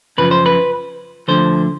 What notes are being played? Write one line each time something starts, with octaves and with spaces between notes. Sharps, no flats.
F#2 C#3 F3 B4
C5
B4
D2 D3 F3 C5